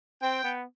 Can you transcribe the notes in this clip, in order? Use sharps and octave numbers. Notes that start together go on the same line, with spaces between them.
C4 G5
B3